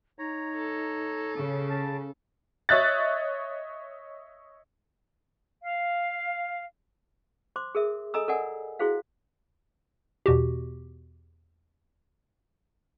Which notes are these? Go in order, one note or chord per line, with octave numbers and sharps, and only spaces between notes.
D#4 C#5 A#5
A4
C#3
A5
C#5 D#5 E5 F#6 A6
F5
C5 C6 D6
G#4 A#4 E5
A4 D#5 G#5 A#5 D#6 E6
A4 A#4 D5 D#5 F#5 G#5
E4 F#4 G#4 C5 F5
E2 B2 F#4 G4